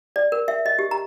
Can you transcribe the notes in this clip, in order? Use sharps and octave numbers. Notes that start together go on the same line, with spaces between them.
D5
A#4
E5
D#5
G4
A#5